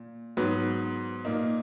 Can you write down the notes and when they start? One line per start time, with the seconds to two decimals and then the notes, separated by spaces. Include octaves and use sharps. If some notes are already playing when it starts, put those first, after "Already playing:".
Already playing: A#2
0.37 G#2 F#3 B3
1.25 A#2 A#3 D#4